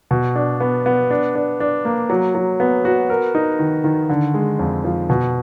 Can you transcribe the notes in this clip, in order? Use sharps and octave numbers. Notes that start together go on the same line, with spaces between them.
B2
D4
B3
B3
D4
D4
D4
A#3
F#3
F#3
B3
F#4
A#4
D#4
D#3
D#3
D3
G#3
F2
F3
B2